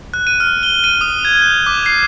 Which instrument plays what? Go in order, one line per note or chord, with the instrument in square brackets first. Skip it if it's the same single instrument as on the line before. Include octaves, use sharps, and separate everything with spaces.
[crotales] F#6
D#7
F6
G7
D#7
D#6
G#6
G6
D6
C7